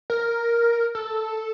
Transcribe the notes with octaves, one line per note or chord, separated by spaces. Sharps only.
A#4
A4